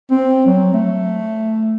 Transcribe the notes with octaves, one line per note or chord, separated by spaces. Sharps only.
C4
F#3
A3